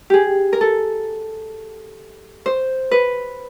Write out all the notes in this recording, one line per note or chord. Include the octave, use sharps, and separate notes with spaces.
G4 G#4
A#4
A4
C5
B4